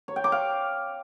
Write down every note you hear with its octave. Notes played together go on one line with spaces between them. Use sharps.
C#5
G5
D6
F5